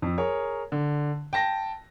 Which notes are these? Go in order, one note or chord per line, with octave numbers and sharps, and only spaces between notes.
F2
G#4 A#4 C#5
D3
G5 A5 A#6